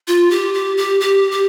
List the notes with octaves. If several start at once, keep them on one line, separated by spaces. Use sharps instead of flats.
F4
G4
G4
G4
G4
G4